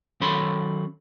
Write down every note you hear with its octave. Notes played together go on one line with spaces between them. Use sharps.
D#3 F#3 C#4 A4 B5 C6